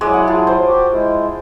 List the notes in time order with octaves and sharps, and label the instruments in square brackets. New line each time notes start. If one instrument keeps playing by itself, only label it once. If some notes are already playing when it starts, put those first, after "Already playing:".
[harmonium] F#3 E4 [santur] G#3 D5 E5
[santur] F#5
F4 G#4 A5
C5
[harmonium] F#4 G4
G#3 E4